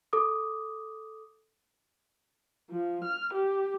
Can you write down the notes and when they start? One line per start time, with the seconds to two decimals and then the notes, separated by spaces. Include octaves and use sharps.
0.13 A4 D6 D#6
2.70 F3
3.04 F6
3.33 G4